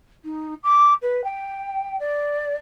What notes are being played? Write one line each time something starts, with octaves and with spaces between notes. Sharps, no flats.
D#4
D6
B4
G5
D5